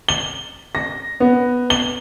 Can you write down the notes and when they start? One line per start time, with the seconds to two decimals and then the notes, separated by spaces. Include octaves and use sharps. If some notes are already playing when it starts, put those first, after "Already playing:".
0.08 G7
0.75 A#6
1.20 B3
1.70 G7